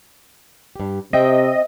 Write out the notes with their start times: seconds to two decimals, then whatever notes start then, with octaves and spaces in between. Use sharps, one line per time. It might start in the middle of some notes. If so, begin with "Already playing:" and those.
0.76 G2 G4
1.13 C3 C4 D#5 E5 G5